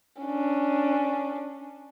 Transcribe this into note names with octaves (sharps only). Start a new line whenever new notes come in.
C#4 D4